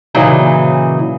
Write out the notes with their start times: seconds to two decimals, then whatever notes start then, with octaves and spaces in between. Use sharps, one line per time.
0.14 A#2 C#3 E3 F#3 D#4